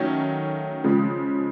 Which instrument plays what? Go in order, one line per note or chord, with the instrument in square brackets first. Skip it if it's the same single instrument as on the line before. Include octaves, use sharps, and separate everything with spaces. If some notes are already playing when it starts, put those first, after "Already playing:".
Already playing: [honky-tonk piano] D#3 F#3 A3 C#4
C#3 F3 G#3